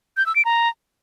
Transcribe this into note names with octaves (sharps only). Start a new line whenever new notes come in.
G6
E6
D7
A#5